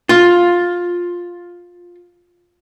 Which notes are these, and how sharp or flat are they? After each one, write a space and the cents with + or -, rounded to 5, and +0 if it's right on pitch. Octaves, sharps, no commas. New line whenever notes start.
F4 +10